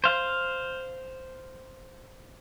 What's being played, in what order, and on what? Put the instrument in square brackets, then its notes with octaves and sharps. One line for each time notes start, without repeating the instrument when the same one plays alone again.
[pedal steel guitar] C5 F5